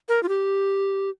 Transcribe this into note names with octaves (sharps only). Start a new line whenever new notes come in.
A#4
F4
G4